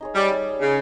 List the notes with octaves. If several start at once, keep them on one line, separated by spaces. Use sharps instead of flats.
D#4 G#4 C#5
G3
D#4 G#4 C#5
C#3 D#4 G#4 C#5